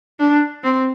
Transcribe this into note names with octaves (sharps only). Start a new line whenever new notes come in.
D4
C4